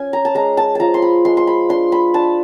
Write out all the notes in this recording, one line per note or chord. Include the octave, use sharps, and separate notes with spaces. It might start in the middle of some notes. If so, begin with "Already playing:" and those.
Already playing: C#4 G#5
A#5
A5
G#3 A#5
A5
F3 A5 A#5
C6
B5
G#3 C6
C6
B5
D4 C6
B5
D4 A5